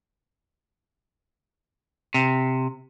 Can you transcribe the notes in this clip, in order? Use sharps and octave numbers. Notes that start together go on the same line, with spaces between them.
C3